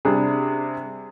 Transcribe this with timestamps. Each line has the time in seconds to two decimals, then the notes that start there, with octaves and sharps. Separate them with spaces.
0.05 C3 G3 D4 G#4